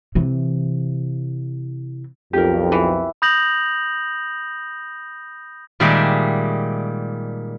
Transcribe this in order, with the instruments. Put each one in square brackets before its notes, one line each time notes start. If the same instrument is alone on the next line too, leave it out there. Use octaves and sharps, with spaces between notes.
[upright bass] C3 E3
[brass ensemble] B1 F2 [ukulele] G4 A#4
[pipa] E3
[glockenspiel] B5 D#6 G6 A#6 F7 F#7
[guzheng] A#2 D#3 G3 G#3 G#4 E5